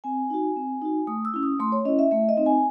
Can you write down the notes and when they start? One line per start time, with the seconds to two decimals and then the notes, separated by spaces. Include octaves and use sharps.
0.04 C4 G#5
0.30 D#4 F#4
0.56 C4
0.82 D#4 F#4
1.07 A3 D#6
1.25 E6
1.34 C#4 E4
1.43 D#6
1.59 A3 C6
1.72 C#5
1.85 C#4 E4 D#5
1.99 E5
2.11 A3 E5
2.29 D#5
2.37 C4 D#4
2.46 G#5